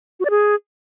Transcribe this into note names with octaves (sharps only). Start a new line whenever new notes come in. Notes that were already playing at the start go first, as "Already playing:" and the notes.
F#4
D5
G#4